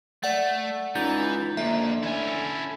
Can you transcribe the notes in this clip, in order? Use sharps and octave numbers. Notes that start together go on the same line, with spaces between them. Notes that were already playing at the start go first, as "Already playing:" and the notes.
A3 D5 F#5 A6
C#2 E3 D#4 G6 A6
F2 D3 A#3 E5
D2 C#4 E4 G#5
A4